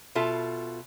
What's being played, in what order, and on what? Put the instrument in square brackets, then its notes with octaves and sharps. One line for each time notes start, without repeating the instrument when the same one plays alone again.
[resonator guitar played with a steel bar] B2 F4 A4 E5